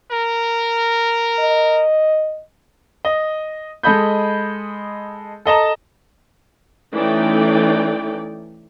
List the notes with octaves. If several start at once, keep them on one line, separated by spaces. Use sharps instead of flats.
A#4
D#5
D#5
G#3 A4 D#5 B5 G6
A4 D#5 A5 A#5
E3 A3 C#4 D#4 D5 G5